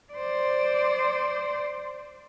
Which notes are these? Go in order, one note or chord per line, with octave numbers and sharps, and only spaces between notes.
C5 D5